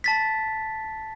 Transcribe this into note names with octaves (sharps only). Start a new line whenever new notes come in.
A5 A6 B6